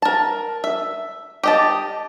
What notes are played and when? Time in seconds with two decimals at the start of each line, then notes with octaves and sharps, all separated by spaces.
0.02 A#4 A5
0.64 E5
1.44 G4 D#5 A5